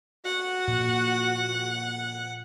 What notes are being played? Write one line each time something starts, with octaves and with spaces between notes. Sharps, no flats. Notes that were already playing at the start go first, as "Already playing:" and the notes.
F#4 F#5
A#2